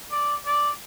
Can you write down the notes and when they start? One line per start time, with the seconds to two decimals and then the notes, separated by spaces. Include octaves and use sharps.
0.11 D5
0.46 D5